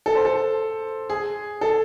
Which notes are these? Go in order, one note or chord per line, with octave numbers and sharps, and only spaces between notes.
A4
C5
A4
G#4
A4